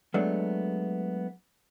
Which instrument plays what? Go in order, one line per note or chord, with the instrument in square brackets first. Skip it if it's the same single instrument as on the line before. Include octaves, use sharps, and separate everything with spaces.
[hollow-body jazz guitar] F#3 G#3 A3 B3 D4